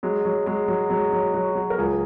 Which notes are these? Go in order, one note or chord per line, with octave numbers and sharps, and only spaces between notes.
F#3 G#3
F#3
F#3 G#3
F#3
F#3 G#3
F#3
F#3 F#4
F#3
A#4
C#2 G#4